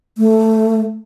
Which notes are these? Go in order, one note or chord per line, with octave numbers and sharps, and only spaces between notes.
A3